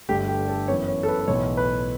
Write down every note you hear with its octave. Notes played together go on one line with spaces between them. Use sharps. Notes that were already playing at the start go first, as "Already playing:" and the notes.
G1 G2 D3 A3 G4
G4
A4
F#2 E3 B3 C#5
C#5
A4
B4
B4
B1 A2 E3 B3 C#5
B4